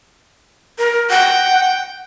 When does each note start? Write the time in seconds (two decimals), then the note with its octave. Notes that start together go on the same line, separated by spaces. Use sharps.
0.78 A#4
1.10 F#5 G5